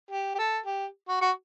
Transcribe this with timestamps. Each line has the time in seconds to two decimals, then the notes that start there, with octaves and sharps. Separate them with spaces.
0.11 G4
0.35 G4
0.39 A4
0.66 G4
1.08 F#4
1.21 F#4